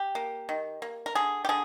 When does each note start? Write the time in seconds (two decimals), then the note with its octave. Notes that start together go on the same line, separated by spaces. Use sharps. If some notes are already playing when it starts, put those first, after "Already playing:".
Already playing: G4
0.15 A#3
0.49 D#3
0.82 A#3
1.06 A#4
1.15 D3 G#4
1.45 G4
1.49 D3 G#4